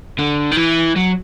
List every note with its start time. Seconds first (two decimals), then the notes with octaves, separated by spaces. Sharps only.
0.19 D3
0.52 D#3
0.57 E3
0.96 F#3